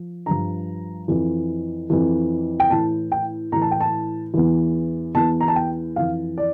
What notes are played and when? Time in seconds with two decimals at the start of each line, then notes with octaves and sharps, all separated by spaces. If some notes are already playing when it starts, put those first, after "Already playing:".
Already playing: F3
0.26 G2 F3 A#5
1.08 F2 E3
1.90 F2 E3
2.60 G5
2.70 A2 E3 A5
3.12 G5
3.52 A2 E3 A#5
3.62 A5
3.71 G5
3.81 A5
4.34 E2 E3
5.15 E2 E3 A5
5.41 A#5
5.48 A5
5.56 G5
5.96 F2 E3 F5
6.38 D5